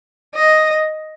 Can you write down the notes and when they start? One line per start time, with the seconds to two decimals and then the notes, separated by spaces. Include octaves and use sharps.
0.35 D#5